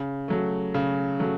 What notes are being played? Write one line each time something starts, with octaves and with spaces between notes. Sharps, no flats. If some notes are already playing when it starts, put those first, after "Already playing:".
Already playing: C#3
F#3 A3
C#3
F#3 A3